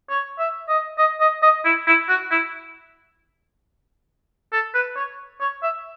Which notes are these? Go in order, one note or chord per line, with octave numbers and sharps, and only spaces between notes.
C#5
E5
D#5
D#5
D#5
D#5
E4
E4
F#4
E4
A4
B4
C#5
C#5
E5